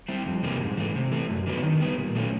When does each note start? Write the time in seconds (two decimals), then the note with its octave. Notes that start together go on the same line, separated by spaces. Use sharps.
0.09 G3 C4 E4
0.26 F2
0.43 C3 E3 G3 A#3
0.60 G#2
0.77 E3 A3
0.95 C3
1.12 E3 A3
1.29 F#2
1.46 D3 F#3 B3
1.63 D#3
1.80 G3 B3
1.98 A#2
2.15 F#3 A3 C#4